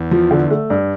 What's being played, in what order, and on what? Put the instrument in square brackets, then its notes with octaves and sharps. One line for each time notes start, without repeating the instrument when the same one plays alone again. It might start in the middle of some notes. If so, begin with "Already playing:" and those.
Already playing: [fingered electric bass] E2
[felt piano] F3
D3
A3
G2